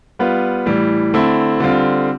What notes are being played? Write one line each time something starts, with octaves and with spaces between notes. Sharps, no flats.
G3 B3 F4 B4
A2 E3 G3
D3 A3 C4 E4
D3 G3 C4 F4